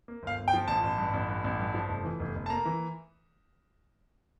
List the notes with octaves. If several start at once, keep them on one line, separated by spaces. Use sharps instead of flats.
A#3
G1 F5
G1
G5
F3
A1 A5
A1
G2
A1
G2
A1
G2
F3
F1
E3
F1
F1
A5
A#3 A#5
E3